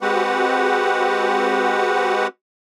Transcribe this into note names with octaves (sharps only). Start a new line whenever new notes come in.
G#3 C4 F#4 G4 B4 F#5